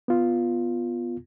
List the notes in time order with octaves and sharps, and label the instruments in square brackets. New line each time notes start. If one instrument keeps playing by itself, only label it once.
[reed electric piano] B3 F4